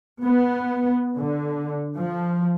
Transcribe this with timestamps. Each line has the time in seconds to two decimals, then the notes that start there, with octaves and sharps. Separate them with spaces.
0.24 B3
1.17 D3
1.98 F3